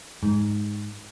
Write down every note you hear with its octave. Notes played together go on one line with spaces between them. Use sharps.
G#2